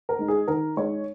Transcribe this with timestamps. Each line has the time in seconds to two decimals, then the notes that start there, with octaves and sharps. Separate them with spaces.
0.09 A#4
0.19 G#3 D#4
0.28 G#4
0.48 D#3 A#4
0.77 G#3 D#4 C#5